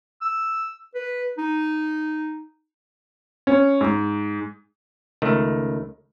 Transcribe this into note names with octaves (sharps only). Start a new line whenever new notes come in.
E6
B4
D#4
C#4
G#2
C#2 D#3 A3